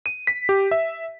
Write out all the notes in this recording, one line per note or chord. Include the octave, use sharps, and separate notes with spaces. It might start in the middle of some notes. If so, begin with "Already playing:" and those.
D#7
B6
G4
E5